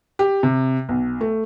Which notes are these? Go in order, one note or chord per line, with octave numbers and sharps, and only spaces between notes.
G4
C3
B1
A3